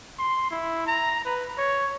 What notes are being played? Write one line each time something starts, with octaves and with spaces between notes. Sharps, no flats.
C6
E4
A#5
B4
C#5